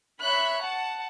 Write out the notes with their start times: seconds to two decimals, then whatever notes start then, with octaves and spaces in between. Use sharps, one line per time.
0.22 C#5 E5 B5 F#6
0.62 F#5 A5